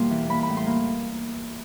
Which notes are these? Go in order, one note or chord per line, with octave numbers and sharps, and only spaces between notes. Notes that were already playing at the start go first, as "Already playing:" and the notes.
Already playing: E2 B2 G3 A#3 C6
E3
A#3 B5
B5
A2
C6
A#3